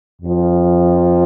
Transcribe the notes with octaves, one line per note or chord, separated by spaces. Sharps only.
F2 F3